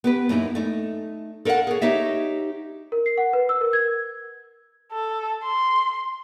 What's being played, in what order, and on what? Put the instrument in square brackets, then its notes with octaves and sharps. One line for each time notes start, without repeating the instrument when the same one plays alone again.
[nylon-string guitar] B3 G4 B4
F#2 A#3 D#4 E4
A3 D#4
A4 A#4 C#5 F5 F#5
G#4 C#5
D#4 G4 C#5 D#5 E5
[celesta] A#4
C7
F#5
B4
E6
A#4
G#6
[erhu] A4
C6